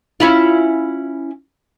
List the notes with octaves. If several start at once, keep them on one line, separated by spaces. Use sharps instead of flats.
C#4 E4 F4